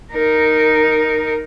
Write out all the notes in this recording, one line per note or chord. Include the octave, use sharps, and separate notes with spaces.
D#4 A#4